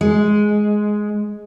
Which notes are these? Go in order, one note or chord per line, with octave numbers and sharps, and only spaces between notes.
G#3